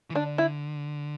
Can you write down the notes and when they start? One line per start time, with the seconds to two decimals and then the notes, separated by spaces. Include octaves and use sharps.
0.10 E3
0.15 D3 D4
0.38 E4